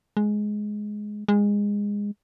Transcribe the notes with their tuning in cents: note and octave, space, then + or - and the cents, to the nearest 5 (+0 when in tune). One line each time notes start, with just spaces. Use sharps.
G#3 +10
G#3 -20